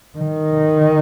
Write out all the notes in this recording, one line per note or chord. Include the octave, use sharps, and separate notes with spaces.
D#3